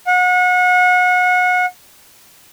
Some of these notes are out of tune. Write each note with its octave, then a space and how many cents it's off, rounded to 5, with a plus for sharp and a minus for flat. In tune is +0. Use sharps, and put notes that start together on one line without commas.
F#5 -30